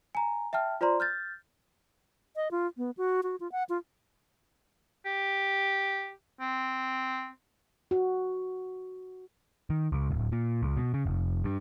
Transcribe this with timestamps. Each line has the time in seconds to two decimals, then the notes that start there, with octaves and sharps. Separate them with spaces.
0.15 G#5 A#5
0.53 E5 G5 A5 F6
0.81 F4 C5 D5 A#5 C6
1.00 F6 G6 A6
2.36 D#5
2.51 F4
2.77 B3
2.97 F#4
3.23 F#4
3.40 F4
3.52 F#5
3.69 F4
5.06 G4
6.40 C4
7.91 F#4
9.70 D#3
9.92 C#2
10.10 D1
10.32 A#2
10.62 C#2
10.77 B2
10.94 C#3
11.06 F1
11.44 G2